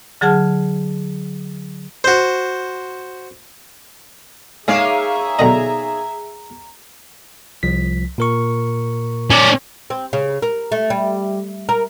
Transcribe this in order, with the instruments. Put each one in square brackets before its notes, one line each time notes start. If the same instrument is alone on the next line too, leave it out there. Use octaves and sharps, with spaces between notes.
[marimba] D3 F#3 G#4 F#5 A5 F6
[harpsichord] F#4 C5
[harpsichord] G#3 [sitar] A#3 D#4 C#5 [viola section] G#4 E5 [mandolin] F5
[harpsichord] B1 D3 D#5 [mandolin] A#5
[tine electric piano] C2 F3 B6
A#2 A#4 C#6
[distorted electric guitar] C#4 D5
[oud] C4
C#3
A#4
A3
G3
A#4